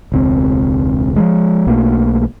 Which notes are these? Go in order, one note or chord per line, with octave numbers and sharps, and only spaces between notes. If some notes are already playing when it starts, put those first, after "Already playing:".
E1 C#2 C4
F3 F#3 G#3
B1 B2 A3 A#3